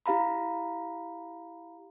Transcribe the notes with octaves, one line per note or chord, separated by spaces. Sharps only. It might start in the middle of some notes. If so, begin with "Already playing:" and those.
E4 G4 F5 A#5 B5